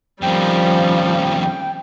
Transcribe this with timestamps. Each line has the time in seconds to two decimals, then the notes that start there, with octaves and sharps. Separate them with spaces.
0.22 F2 D#3 F3 G3 C#4 G5